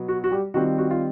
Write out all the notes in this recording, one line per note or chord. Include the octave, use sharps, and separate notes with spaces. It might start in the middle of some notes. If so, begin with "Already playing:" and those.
Already playing: B2 F#3 B3
F#4
F#4
G3 G4
D#3 G3 C4 F4 F#4
F#4
F4